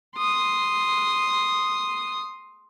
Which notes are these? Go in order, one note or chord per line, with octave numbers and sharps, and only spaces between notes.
C6 D#6